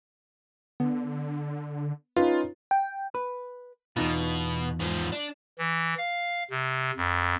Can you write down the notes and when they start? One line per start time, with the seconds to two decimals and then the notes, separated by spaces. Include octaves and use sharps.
0.80 D3 B3
2.16 C#4 D#4 F4 B4
2.71 G5
3.15 B4
3.97 E2 B2 D#4 F4
4.80 G#2 F3
5.12 D4
5.58 E3
5.98 F5
6.50 C3
6.96 F2